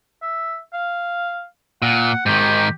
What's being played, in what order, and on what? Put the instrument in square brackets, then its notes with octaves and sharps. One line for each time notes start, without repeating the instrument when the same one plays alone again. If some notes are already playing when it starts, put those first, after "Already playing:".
[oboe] E5
F5
[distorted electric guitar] A#2 [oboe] F#5
[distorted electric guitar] G#2 D#3 [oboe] G4